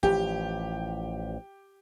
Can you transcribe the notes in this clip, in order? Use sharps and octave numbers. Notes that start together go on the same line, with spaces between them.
A1 E3 F3 G4